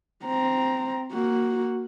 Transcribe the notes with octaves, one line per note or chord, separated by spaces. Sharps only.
C4 A#5
A#3 F#4